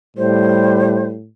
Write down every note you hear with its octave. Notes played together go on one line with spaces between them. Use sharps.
A2 G3 C5